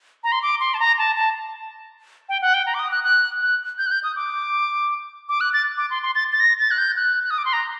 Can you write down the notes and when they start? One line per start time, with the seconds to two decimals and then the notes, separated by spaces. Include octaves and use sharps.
0.24 A#5
0.32 C6
0.43 D6
0.60 C6
0.74 A5
0.79 A#5
0.98 A5
1.16 A5
2.29 G5
2.42 F#5
2.54 G5
2.66 A#5
2.74 D6
2.79 D#6
2.92 F#6
3.04 F#6
3.42 F#6
3.78 G6
3.87 F#6
3.91 G6
4.03 D#6
4.16 D6
5.29 D6
5.41 F#6
5.53 A6
5.78 D6
5.90 C6
6.03 C6
6.15 A6
6.33 A6
6.40 A#6
6.59 A6
6.71 F#6
6.78 G6
6.96 F#6
7.23 F#6
7.31 D#6
7.38 D6
7.45 C6
7.53 A#5